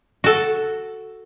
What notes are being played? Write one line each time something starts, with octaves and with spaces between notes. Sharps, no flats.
F#4 A4